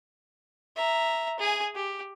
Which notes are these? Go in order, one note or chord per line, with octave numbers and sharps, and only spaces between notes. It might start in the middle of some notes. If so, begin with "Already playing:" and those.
E5 A#5
G#4 G#5
G4